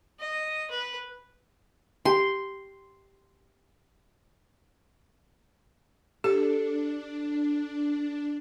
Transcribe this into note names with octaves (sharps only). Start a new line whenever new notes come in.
D#5
B4
G4 C6
D4 G4 A4